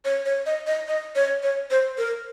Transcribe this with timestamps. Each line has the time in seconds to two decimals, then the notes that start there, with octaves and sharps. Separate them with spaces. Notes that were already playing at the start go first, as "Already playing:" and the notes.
0.05 C#5
0.26 C#5
0.46 D#5
0.67 D#5
0.88 D#5
1.16 C#5
1.43 C#5
1.71 C5
1.98 A#4